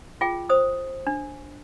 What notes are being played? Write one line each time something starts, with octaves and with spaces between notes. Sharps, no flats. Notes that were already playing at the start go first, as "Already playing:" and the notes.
F4 G#4 G5
C5 D#6
D4